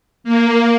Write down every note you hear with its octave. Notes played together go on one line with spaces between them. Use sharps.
A#3